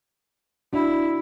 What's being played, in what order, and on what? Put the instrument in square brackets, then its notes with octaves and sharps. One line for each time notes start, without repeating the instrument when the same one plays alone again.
[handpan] D4 F#4 [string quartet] E4